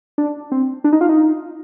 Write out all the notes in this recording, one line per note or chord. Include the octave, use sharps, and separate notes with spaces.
D4
C4
D4
D#4
F4
D#4